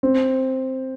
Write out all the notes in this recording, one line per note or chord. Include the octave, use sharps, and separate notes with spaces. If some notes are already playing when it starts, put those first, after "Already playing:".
C4